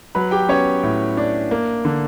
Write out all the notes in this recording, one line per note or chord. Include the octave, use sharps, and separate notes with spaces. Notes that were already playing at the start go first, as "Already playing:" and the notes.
F#3 B4 B5
G4 G5
B3 C#4 C#5
A2
D4
A#3
D3